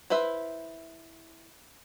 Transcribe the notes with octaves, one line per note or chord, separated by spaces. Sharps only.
E4 B4 C5 E5